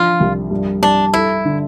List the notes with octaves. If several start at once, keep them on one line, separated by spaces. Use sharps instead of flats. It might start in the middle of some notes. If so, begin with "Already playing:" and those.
Already playing: F3 D4 F4
C2
G2
G2 D4
E4 A4
D3